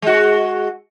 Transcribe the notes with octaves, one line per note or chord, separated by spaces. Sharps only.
G#3 F#4